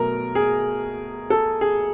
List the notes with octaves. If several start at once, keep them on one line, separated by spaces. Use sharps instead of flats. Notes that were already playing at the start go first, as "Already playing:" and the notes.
Already playing: B2 F#3 A3 A#4
G#4
A4
G#4